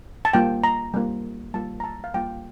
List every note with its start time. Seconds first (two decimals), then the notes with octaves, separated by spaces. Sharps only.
0.25 A5
0.33 G3 A#3 F4 G5
0.64 A#5
0.94 G3 A#3 F4
1.54 G3 A#3 F4 A5
1.80 A#5
1.84 A5
2.04 F5
2.14 G3 A#3 F4 G5